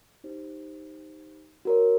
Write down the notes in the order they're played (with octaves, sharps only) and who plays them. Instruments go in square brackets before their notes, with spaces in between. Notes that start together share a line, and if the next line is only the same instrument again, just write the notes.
[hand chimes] D#4 G4 C5
F#4 A#4 C#5